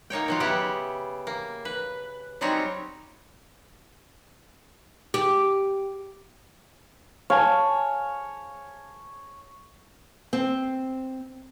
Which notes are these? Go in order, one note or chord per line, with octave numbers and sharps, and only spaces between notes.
A#3 D#4 C#5 G5
D#3 F#3 F4
C#3 B3 E4 G4 F#5 G5
A#3
B4
F#3 G3 C4 C#4 D#4 C#5
G4
C#5 F5 G#5 A5
C4